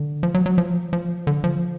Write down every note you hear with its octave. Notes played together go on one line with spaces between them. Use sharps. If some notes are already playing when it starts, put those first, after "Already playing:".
Already playing: D3
F3
F#3
F#3
F3
F3
D3
F3